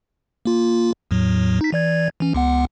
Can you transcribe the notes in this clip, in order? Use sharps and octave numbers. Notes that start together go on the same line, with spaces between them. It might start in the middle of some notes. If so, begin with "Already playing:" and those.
A#3 F4
E2 A2 F#3
D#4 B6
E3 D5 G#6
E3 C#4
C#2 B3 F#5